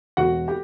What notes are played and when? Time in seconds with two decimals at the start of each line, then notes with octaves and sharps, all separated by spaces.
0.17 E1 F#4 F#5
0.48 G4 G5